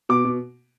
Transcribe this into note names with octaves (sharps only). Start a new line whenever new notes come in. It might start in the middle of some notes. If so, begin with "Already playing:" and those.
B2 D6
B2